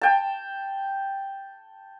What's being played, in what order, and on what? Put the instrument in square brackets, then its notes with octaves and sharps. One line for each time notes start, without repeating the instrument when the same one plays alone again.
[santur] G5 A5